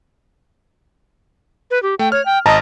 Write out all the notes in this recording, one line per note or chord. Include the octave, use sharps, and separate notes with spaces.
B4
G4
A3 G5
C#5 F6
G5
G#1 D#5 A5 A#5